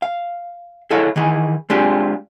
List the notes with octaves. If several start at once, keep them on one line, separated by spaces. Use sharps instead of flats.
F5
E4 G#4 A4 C#5 D#5 F5
D#3 E3 G#4
G#3 C4 D4 F4 G4 G#4